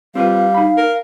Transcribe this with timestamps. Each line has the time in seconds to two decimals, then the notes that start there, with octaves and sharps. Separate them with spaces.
0.15 G3 C4 F4 B4 F5
0.54 D#4 B5
0.78 A#4